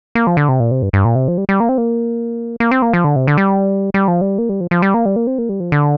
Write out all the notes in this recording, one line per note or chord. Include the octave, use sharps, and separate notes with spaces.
A#3
F3
D3
C3
A#2
C3
G2
G2
A#2
C3
F3
G3
G3
A#3
C4
A#3
A#3
C4
A#3
F3
D3
C3
D3
G3
G3
F3
G3
A#3
G3
F3
F3
G3
A#3
G3
A#3
C4
A#3
G3
F3
D3